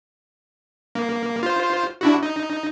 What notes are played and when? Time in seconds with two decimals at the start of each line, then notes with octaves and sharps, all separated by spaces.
0.95 A#3
1.43 F4 C5
2.01 D4 E4 F#4
2.23 D#4